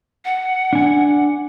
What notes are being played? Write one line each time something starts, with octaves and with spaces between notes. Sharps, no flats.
F#5
D4 G#5